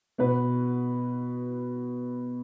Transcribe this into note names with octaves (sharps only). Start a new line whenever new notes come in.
B2 B3 F#4 B4